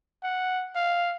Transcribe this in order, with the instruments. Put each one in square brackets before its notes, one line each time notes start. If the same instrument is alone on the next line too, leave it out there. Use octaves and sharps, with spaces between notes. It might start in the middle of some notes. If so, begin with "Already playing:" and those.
[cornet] F#5
F5